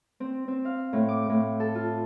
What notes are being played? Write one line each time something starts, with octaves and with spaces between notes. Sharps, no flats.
C4
C4
F5
A2
D6
A2
A4
F4